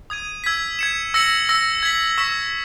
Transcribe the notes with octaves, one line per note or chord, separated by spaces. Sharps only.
D#6 G#6 D#7
E6 G#6 B6
G#6 C#7 E7
E6 A#6 C#7 F#7
E6 A#6 C#7
G#6 B6 F#7
C#6 E6 B6 E7